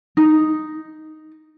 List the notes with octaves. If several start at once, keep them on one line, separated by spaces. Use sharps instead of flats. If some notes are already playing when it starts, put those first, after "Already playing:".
D#4